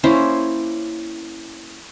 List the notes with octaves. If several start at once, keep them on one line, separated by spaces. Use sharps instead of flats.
A#3 C#4 E4 C5